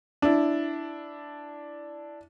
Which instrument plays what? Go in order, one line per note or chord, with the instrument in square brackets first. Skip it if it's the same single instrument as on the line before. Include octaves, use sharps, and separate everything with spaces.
[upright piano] D4 E4